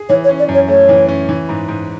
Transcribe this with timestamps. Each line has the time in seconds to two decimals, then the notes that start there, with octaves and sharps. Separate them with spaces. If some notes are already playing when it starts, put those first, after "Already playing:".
Already playing: G#4
0.09 E3 C#5
0.24 C#5
0.29 C#4
0.39 D5
0.48 F#2
0.54 C#5
0.68 A3 C#5
0.89 E3
1.08 C#4
1.29 E3
1.49 G#2
1.68 G#2